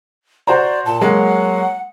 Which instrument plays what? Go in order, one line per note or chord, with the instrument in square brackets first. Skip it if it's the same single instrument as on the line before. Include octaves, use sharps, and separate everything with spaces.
[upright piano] F#4 C5 A#5 [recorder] D5
[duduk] A#2 [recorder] A5
[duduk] F#3 [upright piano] G#3 A#3 [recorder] F#5